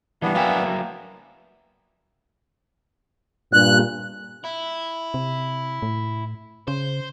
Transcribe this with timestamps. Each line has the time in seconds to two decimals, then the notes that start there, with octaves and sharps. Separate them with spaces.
0.22 E3 G3 B3 D4
0.35 F#3 A#3 E5 F5 G5 G#5
3.53 G2 A#2 F#6
4.45 E4
5.14 C3
5.82 A2
6.68 C#3 C5